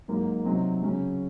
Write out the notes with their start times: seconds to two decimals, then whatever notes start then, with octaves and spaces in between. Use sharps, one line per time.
0.08 G#2 F#3 A#3 D#4
0.44 C3 F#3 C4 D#4
0.82 C#3 F#3 C#4